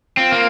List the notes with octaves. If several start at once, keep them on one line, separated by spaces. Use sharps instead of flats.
C4 F4
A#3